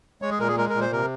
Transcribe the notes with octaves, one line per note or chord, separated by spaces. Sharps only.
G#3 C#5
G#4
A#2 A#4
G#4
G#3 A#4
A#4
A#2
C5
C3 A#4